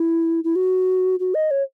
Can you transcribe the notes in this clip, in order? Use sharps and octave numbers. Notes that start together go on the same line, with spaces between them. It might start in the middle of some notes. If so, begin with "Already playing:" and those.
Already playing: E4
E4
F#4
F#4
D#5
C#5